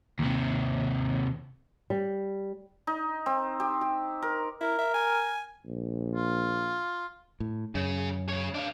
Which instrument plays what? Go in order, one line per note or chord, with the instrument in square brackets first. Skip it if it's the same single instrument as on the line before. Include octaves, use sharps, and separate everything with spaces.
[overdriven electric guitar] D#2 C3
[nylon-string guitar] G3
[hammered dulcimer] D#4
C4
G4
G4
A#4
[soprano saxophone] E4 [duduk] A#4
[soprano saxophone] E5
G#5
[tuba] A#1
[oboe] F4
[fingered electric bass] A2
[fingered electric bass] F#2 [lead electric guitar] C#3
[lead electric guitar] C#3 C#5
D4 F5